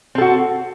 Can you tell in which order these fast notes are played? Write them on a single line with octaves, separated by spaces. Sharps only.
C4 A4 F#4